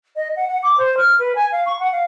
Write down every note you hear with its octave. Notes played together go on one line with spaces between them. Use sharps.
D#5
F#5
F#5
D6
C5
F6
B4
G#5
F5
C#6
F#5
F5